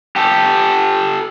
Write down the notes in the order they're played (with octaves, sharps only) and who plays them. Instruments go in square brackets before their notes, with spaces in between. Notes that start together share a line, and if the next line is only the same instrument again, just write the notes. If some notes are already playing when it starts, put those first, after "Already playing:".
[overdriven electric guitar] G4 A4